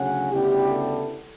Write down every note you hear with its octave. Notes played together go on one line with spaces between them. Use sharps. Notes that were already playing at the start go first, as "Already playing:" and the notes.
Already playing: D2 C#3 F#3 C#4 F#5
D2 C#3 G3 B3 E4 G4
A4